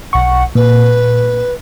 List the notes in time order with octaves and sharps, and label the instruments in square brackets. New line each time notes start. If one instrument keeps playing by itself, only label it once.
[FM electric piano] B1 C#6 [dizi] F#5
[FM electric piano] A#2 [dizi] B4